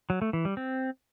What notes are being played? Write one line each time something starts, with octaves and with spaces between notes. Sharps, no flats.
F#3
A3
E3
G3
C4